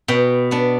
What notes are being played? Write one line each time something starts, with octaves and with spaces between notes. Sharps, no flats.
B2 G5
B3 D4